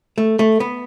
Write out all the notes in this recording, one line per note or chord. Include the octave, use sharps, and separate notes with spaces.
A3
A3
B3